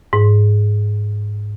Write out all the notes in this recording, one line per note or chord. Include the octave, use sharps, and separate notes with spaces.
G#2